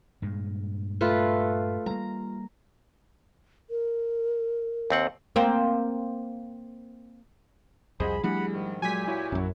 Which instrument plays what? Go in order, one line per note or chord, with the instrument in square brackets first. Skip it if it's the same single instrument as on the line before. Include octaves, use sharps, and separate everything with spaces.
[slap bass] G2 A#2 G#3
[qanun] A3 F4 B4
[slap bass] G3 A#3 [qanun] A#5
[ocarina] A#4
[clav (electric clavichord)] D#2 C4 F#5
[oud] A#3 C4
[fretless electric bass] C2 F2 G3 [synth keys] G#4 [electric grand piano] C5 D#5 F#5 [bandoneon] B5
[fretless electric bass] F3 A3 D4 [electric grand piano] G3 E4 [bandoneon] F#5 B5
[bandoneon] G#2 D#3
[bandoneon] A#2 G4 [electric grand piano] F#3 G#3 [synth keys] G#5 B6
[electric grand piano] E4 F#4 C#5
[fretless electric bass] A#1 F#3 [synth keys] F#2